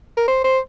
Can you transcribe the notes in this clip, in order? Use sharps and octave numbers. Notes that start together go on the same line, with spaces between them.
A#4
C5
C5